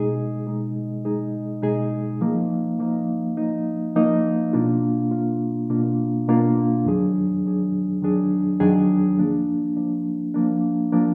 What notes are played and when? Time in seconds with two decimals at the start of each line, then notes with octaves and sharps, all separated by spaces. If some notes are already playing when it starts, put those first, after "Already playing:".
Already playing: B2 G#3 D#4 G#4
0.47 B2 G#3 D#4 G#4
1.05 B2 G#3 D#4 G#4
1.63 B2 G#3 D#4 G#4
2.21 F3 A#3 D#4
2.79 F3 A#3 D#4
3.37 F3 A#3 D#4
3.95 F3 A#3 D#4
4.53 B2 A#3 D4 F4
5.11 B2 A#3 D4 F4
5.70 B2 A#3 D4 F4
6.28 B2 A#3 D4 F4
6.85 F2 D#3 F#3 D4 G#4
7.44 F2 D#3 F#3 D4 G#4
8.02 F2 D#3 F#3 D4 G#4
8.60 F2 D#3 F#3 D4 G#4
9.18 F3 A#3 D4
9.76 F3 A#3 D4
10.34 F3 A#3 D4
10.93 F3 A#3 D4